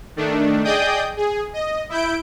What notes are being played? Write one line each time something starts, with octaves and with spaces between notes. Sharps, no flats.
D#3 A3 D4
G#4 D5 D#5 G5 D#6 G6
G#4
D#5
E4 G6 D7